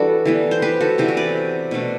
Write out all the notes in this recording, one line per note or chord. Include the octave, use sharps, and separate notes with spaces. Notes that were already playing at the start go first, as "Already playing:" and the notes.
Already playing: E3 G3 D4 F#4 A4 B4 D5
E3 G3 B3
C5
G4 B4
F#4 A4
C3 E3 G3 B3 G4
F#4
B4 D5
B2 A3 D4